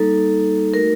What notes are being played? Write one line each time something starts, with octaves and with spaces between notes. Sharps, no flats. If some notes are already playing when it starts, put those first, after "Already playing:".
Already playing: G3 A#3 D#4 A4
A3 D#4 F#4 A#4